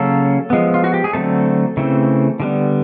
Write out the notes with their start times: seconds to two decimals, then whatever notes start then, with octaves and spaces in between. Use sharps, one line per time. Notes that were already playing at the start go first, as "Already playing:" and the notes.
Already playing: C#3 F#3 A#3 C#4 A4
0.50 F3 G#3 B3
0.74 F4
0.84 F#4
0.94 G4
1.04 G#4
1.13 D3 F#3 A3 C4 A4
1.77 C#3 E3 A3 C4
2.40 D3 G3 B3